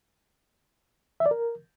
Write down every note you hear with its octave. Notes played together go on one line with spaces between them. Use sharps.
E5
D5
A#4